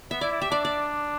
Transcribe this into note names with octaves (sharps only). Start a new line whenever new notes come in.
B3 E5
E4 D5
E4
G4 E5
D4 D5
D5